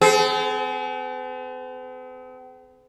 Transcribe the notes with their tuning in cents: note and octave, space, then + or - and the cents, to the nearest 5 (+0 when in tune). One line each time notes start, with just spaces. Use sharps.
C4 -45 G#4 +40